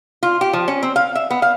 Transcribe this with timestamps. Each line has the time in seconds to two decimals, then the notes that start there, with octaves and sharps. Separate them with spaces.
0.23 F4
0.41 G4
0.53 F3
0.68 C#4
0.83 C4
0.96 F5
1.15 E5
1.30 B3
1.42 F5